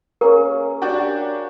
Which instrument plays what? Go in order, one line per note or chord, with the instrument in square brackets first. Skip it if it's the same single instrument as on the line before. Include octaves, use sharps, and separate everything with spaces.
[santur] A#3 C#4 G#4 [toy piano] A#4
[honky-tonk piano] D4 F#4 G4